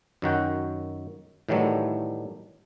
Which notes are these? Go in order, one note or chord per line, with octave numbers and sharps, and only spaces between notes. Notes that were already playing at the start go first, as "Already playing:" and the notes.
F#2 D#3 F#4 G5
A2 D#3 E3 F#3 G3 A3